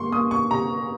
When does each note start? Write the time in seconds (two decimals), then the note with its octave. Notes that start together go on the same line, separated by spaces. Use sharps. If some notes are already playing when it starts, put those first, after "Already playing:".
Already playing: A#3 C6 C#6
0.12 A#3 D#6
0.31 C#6
0.50 C3 A#5